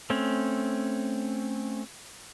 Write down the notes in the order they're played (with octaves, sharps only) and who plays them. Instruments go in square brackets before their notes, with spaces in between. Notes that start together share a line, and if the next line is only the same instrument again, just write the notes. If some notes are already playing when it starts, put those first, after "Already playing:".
[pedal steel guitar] A3 C4 C#4